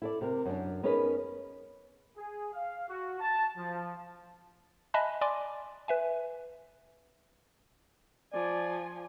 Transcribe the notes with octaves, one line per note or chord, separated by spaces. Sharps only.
E4 A4 D5
C3 A#4
F#2 D4
B3 C#4 D#4 G#4 A#4 B4
G#4
F5
F#4
A5
F3
D#5 E5 G#5 A5 B5 F#6
D5 G#5 C6 D6
B4 E5 G#5
F3 D5 G#5